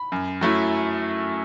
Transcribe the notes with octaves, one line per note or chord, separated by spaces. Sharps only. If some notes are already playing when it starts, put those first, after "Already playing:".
Already playing: B5
F#2
F#3 A3 E4